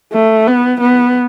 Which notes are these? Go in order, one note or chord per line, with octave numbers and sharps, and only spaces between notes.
A3
B3
B3